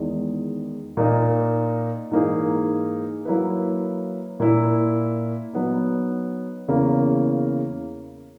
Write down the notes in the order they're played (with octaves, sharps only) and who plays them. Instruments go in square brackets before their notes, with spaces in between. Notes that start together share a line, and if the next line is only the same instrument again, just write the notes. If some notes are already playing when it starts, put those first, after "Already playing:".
Already playing: [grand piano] E2 D#3 G#3
A#2 A#3 D#4
G#2 E3 A#3 D#4 G#4
F#3 A#3 E4 B4
A#2 A#3 E4
F#3 B3 D#4
E2 C#3 E3 A#3